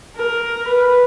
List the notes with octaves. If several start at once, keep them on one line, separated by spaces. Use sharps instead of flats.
A#4
B4